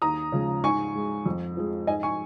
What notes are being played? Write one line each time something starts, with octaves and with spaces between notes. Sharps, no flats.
D#2 A#5 D#6
C#3 F3 G#3
G#2 G#5 C#6
G#3
F2
F3 G#3
G#2 D#5 G#5
G#5 C#6